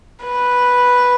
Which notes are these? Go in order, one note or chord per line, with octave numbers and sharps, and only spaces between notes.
B4